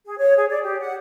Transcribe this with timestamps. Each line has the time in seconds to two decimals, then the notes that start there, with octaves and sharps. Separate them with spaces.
0.05 G#4
0.18 C#5
0.37 G#4
0.50 D5
0.64 G4
0.80 F#5